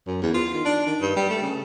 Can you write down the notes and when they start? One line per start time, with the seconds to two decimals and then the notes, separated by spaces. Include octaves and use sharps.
0.07 F#2
0.22 E2
0.34 F4
0.54 D#3
0.65 D4
0.86 D#3
1.01 G2
1.16 G3
1.30 A3
1.42 C#3